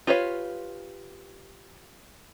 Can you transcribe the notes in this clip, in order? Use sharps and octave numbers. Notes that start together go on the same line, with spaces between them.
F4 G4 B4 C#5 F5